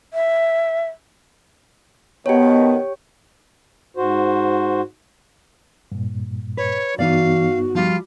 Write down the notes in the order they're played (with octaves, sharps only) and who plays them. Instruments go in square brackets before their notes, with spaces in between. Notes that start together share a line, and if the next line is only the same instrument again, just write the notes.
[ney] E5
[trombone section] B2 D#3 [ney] B3 [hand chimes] G4 C#5
[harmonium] G#2 F#4 C5
[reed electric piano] G2 A#2
[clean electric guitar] B4 [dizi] C#5
[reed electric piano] G2 B3 D#4 [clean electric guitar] E3 D5 [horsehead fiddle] F#4 [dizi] F5
[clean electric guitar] F3 G3 [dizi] F4